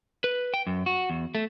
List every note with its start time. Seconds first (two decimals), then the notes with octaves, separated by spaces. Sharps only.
0.24 B4
0.54 G5
0.67 F#2
0.86 F#4
1.10 E2
1.35 A3